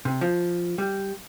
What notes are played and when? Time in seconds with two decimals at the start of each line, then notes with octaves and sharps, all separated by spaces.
0.05 C3
0.21 F3
0.78 G3